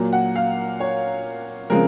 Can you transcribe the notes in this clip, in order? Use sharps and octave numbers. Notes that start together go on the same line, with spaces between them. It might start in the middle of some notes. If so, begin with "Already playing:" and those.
Already playing: A#2 F#3 A#3
F#5
F5
C#5
C#3 F3 G#3 C4 A#4